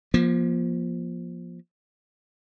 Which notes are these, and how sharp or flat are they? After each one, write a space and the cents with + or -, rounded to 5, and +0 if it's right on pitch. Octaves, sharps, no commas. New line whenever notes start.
F3 +0 A#3 +40